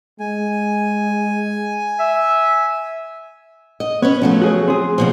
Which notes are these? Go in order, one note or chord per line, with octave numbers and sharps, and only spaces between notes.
G#3 G#5
E5
D#5
B3 C#4 B4 C#5
F3 F#3 A3
F#4 G#4 C#5
C4 G#4
D#2 B2 F3